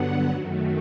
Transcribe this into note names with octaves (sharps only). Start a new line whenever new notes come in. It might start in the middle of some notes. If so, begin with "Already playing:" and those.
Already playing: G2 D3 F#3 B3 F#5
F#2 D#3 F#3 A3